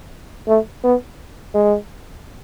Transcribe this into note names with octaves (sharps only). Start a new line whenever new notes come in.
A3
B3
G#3